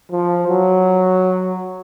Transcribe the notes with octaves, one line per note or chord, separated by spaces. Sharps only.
F3
F#3